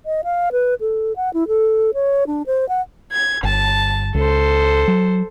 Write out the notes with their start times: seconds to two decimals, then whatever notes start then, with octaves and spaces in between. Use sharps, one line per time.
0.06 D#5
0.24 F5
0.52 B4
0.80 A4
1.16 F#5
1.34 E4
1.48 A4
1.94 C#5
2.27 D4
2.47 C5
2.69 F#5
3.11 G#6
3.43 G1 A5
4.14 C#2 A4 C5
4.88 F#3